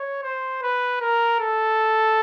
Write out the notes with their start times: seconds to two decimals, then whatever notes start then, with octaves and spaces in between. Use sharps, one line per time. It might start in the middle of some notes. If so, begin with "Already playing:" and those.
Already playing: C#5
0.23 C5
0.62 B4
1.01 A#4
1.40 A4